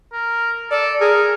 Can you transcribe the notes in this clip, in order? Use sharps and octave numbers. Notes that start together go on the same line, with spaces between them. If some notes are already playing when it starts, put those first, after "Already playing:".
A#4
A4 D5
G#4 A#4